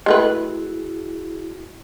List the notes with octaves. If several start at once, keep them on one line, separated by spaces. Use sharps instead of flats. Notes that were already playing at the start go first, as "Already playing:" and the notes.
G#3 A3 E4 F#4 G#4 B4